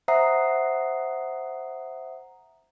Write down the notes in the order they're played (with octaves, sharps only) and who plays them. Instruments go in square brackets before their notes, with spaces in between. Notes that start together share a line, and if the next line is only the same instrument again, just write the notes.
[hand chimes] C5 E5 F#5 A#5 D#6 C7